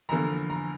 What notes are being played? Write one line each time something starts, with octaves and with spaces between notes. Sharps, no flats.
F1 E2 D3 F3 A#3 A#5
A#5